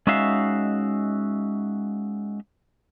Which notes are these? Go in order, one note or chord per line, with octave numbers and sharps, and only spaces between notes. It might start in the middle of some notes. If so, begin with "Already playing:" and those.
G#3 C#4 D#4 F#4 E5 F5